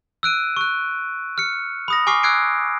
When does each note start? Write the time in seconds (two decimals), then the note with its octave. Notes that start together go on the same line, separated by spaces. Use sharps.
0.23 E6 F#6 D7 D#7
0.57 C#6 F#6
1.38 F6 C#7
1.88 B5 D#6 A#6
2.07 G#5 C#6 D6 F6 C7
2.23 E6 F#6 G#6 C7 D7